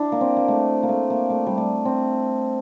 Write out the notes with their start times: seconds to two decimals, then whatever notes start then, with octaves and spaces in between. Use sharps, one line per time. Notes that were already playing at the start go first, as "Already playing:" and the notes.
Already playing: D4 E4
0.12 A#3
0.21 C4
0.37 A#3
0.48 A3
0.83 A#3
0.89 A3
1.10 A#3
1.30 A3
1.47 G3
1.58 A3
1.85 C4